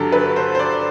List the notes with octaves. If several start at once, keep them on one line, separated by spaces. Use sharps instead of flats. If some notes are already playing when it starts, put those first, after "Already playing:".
Already playing: G2 D3 F#3 G4 A4
B4
C5
C5
D5